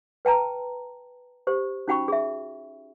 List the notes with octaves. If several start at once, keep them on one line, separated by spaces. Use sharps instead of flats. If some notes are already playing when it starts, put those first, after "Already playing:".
B4 G5 A5 A#5
G4 C5
C#4 D#4 F#4 G5 B5 C#6
G#4 E5